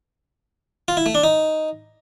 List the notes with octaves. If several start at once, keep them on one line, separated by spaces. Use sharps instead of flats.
F4
E4
A3
D4
D#4